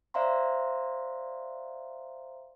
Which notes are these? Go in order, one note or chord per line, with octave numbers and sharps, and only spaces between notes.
C5 D5 E5 F5 A#5 C6